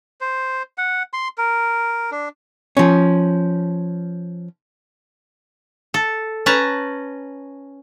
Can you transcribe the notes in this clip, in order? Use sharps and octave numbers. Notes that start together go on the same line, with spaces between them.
C5
F#5
C6
A#4
D4
F3 C#4
A4
C#4 B4 A5 A#5